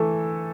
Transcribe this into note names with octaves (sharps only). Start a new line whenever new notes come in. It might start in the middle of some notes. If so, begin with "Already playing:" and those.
Already playing: E3 A3 A4